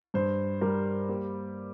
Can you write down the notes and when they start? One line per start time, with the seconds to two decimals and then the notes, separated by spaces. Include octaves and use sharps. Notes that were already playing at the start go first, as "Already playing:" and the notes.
0.14 G2 C5
0.61 G3 A#4
1.09 A#3 G4